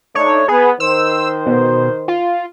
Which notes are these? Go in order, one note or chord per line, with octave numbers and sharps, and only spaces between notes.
A3 D4 D#4 C#5
B3 G#4
D#3 C5 E6
B2
F4